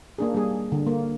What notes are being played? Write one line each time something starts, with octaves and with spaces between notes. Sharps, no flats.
A#3 D4 G#4
G3 A#3 G#4
D3
A#3